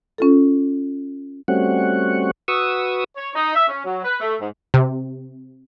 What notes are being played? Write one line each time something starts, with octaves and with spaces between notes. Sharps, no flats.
C#4 F4 A4
G3 A3 C4 C#4 F#4 F#5
F#4 B4 C#6 D#6 E6
C#5
D#4
E5
C#4
F#3
B4
A3
G#2
C3